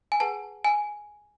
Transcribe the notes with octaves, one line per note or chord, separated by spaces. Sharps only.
G#5
G#4 B4 F#5 A5
G#5